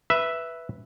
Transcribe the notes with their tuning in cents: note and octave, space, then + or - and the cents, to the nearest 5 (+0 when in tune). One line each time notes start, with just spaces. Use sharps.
B4 +0 E5 +0